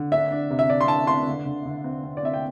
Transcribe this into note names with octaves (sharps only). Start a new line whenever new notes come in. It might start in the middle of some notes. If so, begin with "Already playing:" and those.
Already playing: D3
D4 E5
D4
C3
E5
D4 D5
C6
D4 A5
D4 C6
D3
D3
D3
C4
C4
D5
C4 E5
G5